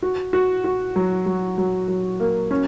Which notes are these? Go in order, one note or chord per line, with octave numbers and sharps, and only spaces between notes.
F#4
F#4
F#4
F#3
F#3
F#3
F#3
A#3
C#4